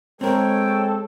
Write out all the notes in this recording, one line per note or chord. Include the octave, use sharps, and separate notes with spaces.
G#3 C4 A4 A#4 C#5 G5